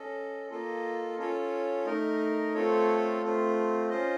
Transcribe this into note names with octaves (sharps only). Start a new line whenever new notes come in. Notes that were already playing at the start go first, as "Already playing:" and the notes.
Already playing: C#4 A4 D#5
A#3 F4 A4 D#5
C#4 F4 A4 C#5
A3 D#4 A#4 D#5
A3 C4 F4 A4 C#5
A3 C4 F4
C#4 F4 C5 D#5